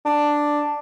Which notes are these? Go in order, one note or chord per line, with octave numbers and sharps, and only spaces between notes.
D4